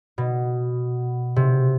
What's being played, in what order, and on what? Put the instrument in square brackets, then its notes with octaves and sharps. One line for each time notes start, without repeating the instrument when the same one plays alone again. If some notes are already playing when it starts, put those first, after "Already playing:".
[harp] B2
C3